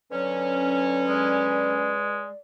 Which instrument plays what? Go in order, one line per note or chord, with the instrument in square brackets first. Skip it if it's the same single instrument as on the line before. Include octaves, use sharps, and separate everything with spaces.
[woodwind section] D3 F#3 C#4 [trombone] B4 [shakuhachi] C#5
[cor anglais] G#3 [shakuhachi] D5